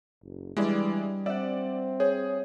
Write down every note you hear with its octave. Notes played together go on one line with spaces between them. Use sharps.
F#1
E3 G3 G#3 D4 E4 D5
C4 D5 E5 F#5
G#4 C#5